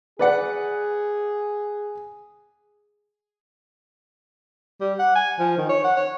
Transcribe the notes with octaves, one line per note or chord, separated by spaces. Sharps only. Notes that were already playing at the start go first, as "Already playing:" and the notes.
G#4 B4 D5 F#5
G3
F#5
G#5
F3
D#3
C#5
F#5
C#5